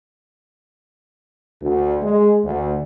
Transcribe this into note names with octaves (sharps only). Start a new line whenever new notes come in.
D2
G#3
D2